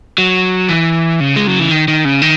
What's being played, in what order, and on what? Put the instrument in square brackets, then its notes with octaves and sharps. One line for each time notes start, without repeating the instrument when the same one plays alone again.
[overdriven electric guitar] F#3
E3
C#3
G#3
F#3
E3
D#3
D#3
C#3
D#3